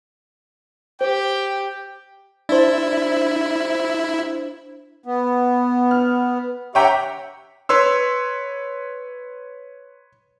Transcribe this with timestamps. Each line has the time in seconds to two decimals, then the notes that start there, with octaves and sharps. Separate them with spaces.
1.01 G4 C5 G5
2.49 D4 E4 C5
5.05 B3
5.91 F6
6.75 G4 C#5 E5 F#5 G5 A#5
7.69 B4 C#5 C6 E6